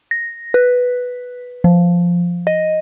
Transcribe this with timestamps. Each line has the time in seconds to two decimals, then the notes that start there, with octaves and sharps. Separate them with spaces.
0.11 A#6
0.54 B4
1.64 F3
2.47 D#5